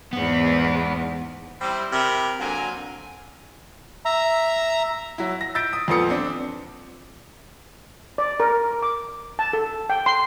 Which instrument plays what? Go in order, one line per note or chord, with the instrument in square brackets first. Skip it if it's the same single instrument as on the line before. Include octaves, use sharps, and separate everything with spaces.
[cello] E2 G#2 [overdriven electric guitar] B3
[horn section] G3 C4 E4
C3 A#4 B5
D3 F#3 A#3 C4 G#5 A#5
[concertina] E5 A#5
[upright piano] F#3 E4
A#6
E6 G6 A6 B6 D7
D#6
F2 A#2 B3 A4 D#6 C#7
C4 D4
[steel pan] D5
A#4
D6
A5
A4
G5
C6